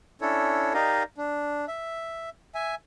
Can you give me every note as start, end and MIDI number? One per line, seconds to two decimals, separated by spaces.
0.21 0.73 61
0.21 0.73 62
0.21 0.73 64
0.21 0.73 69
0.21 0.73 73
0.74 1.03 63
0.74 1.03 67
0.74 1.03 70
0.74 1.03 74
0.74 1.03 75
0.74 1.03 77
1.18 1.65 62
1.68 2.30 76
2.55 2.75 76
2.55 2.75 80